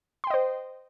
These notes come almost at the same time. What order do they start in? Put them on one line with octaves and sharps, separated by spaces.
C6 G5 D#5 C5